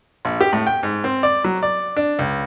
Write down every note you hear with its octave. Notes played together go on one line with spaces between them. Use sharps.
A#1
G4
A2
G5
G#2
C4
D5
F#3
D5
D4
C#2